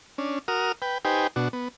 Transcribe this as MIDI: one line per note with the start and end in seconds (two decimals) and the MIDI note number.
0.18 0.39 61
0.18 0.39 62
0.48 0.72 66
0.48 0.72 70
0.48 0.72 87
0.48 0.72 89
0.82 0.98 71
0.82 0.98 79
1.05 1.27 63
1.05 1.27 67
1.05 1.27 71
1.05 1.27 72
1.05 1.27 79
1.05 1.27 80
1.36 1.48 47
1.36 1.48 62
1.36 1.48 66
1.53 1.68 59